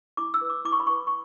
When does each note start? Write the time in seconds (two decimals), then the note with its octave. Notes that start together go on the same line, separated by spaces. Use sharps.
0.17 E4 D6
0.34 E6
0.41 B4
0.50 D6
0.65 E4 D6
0.72 C#6
0.80 B5
0.87 B4 C#6
1.07 C#6